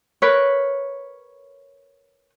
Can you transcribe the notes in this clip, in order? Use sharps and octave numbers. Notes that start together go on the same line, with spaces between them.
A#4 B4 C#5